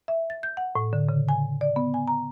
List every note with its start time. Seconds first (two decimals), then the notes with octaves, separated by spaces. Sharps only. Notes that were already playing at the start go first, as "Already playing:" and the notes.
0.08 E5
0.30 A6
0.43 G6
0.57 F#5
0.76 A2
0.93 D3
1.09 C#3
1.29 G#5
1.61 D5
1.76 B3
1.94 G#5
2.07 A#5